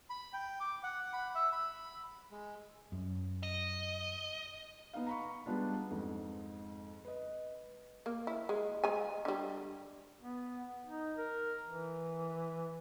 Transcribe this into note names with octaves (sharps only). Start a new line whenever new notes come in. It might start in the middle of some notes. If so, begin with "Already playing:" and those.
B5
G5
D6
F#5
B5
E5
B5
G#3
F#2
D#5
B3 D#4 F5
A#5 B5 C#6
G3 G#3 B3 D4 F4
F2 G#2
B4 D#5
A#3
E4
G#3
G#3 G#5
D3 G3
B3
D#4
A#4
E3